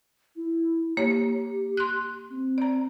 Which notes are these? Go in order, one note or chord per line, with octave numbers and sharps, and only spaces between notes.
E4
A#3 G4 C#5
C6 F#6
C4
D5 A#5